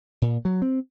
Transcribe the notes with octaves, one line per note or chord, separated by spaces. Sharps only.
A#2
F#3
C4